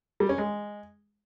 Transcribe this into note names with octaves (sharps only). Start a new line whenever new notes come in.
G3
C#4
G#3